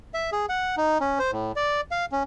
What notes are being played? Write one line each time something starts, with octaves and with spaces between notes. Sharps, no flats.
E5
G#4
F#5
D#4
C#4
C5
A2
D5
F5
C#4